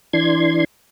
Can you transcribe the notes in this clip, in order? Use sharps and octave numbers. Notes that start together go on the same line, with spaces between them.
E3 D4 C6 G#6